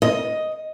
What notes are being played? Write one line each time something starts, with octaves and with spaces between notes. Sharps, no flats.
D#5